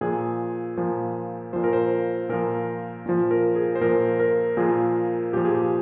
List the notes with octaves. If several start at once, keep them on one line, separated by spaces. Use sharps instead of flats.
A#2 F3 G#4
A#2 F3
A#2 F3 C5
A#4
C5
A#2 F3 A#4
A#2 F3
A#4
G#4
C5
A#2 F3 A#4
A#4
A#2 F3 G#4
A#2 F3 G4
G#4
G4